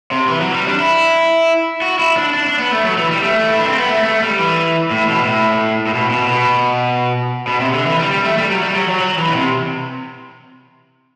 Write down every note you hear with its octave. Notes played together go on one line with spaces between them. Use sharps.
C3
E3
F#3
G3
D4
E4
F#4
E4
D4
D4
D4
B3
A3
F#3
E3
G3
A3
E4
D4
C4
B3
A3
A3
G3
E3
A2
B2
A2
A2
B2
B2
B2
B2
C3
D3
E3
G3
G3
A3
G3
F#3
G3
F#3
F#3
F#3
E3
B2
C3